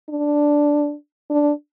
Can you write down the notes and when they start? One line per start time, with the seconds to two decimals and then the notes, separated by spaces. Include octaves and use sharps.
0.09 D4
1.30 D4